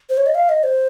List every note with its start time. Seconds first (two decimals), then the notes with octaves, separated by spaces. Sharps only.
0.10 C5
0.17 C#5
0.26 D#5
0.35 F5
0.49 D#5
0.63 C5